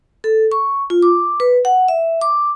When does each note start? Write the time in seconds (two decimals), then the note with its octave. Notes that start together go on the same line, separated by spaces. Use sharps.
0.24 A4
0.52 C#6
0.90 F4
1.03 D6
1.40 B4
1.65 F#5
1.88 E5
2.21 D6